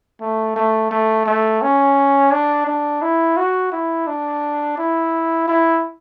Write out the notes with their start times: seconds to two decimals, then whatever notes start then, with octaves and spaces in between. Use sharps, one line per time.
0.21 A3
0.56 A3
0.91 A3
1.26 A3
1.62 C#4
2.32 D4
2.67 D4
3.02 E4
3.37 F#4
3.72 E4
4.07 D4
4.78 E4
5.48 E4